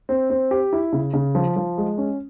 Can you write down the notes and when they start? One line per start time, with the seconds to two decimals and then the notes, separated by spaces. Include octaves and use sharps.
0.09 C4
0.30 C4
0.51 G4
0.73 E4
0.93 C#3
1.14 C#3
1.35 F3
1.56 F3
1.78 G#3
1.98 C#4